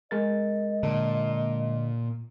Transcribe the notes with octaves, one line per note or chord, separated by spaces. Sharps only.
G#3 A#4 D#5 A6
A#2 D3